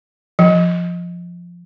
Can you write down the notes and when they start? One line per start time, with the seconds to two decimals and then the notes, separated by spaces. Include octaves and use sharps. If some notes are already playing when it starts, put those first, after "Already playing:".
0.39 F3